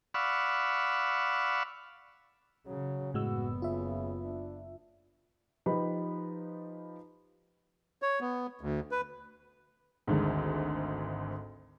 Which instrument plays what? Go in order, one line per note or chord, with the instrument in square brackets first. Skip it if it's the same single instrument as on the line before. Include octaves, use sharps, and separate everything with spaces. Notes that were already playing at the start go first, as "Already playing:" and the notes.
[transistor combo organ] D5 F5 F#5 B5 C#6 E6
[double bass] C#3 [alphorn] F#3
[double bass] F#1 B3 [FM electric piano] A2 G#3 E6 [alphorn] F#4
[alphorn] C#3 [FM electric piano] F4 E5
[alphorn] D4
[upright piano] F3 D#4 G4 B4 B5
[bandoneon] C#5
B3
D2
B4
[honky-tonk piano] G#1 D2 G#2